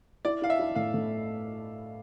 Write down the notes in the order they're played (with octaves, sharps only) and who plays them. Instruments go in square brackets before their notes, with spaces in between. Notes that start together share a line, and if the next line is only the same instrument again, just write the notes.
[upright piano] E4 [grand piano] D5
[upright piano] E4 [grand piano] F5
[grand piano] E5
[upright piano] E4
[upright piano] A2 [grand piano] F5
[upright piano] A2